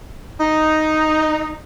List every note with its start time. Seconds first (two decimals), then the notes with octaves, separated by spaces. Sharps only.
0.40 D#4